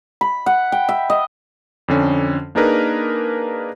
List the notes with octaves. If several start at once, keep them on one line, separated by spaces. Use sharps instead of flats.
B5
F#5
G5
E5
D#5
F2 D3 C#4
A#3 D4 D#4 G#4 A#4 B4